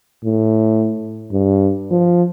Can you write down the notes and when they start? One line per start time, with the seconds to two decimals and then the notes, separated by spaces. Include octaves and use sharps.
0.24 A2
1.32 G2
1.91 F3